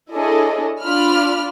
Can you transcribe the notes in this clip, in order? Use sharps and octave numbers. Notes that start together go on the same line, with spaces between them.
D4 E4 G#4 A4 C#5 D#5
D4 F4 B5 F6